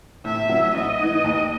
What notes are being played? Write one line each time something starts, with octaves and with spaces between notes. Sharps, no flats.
A2 E5
F#3 C#4 E4
A1 D#5
G#2 E3
D#2